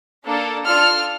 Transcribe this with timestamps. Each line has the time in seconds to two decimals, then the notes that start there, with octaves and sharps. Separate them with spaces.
0.25 A#3 D4 A4
0.64 D4 F4 A4 F6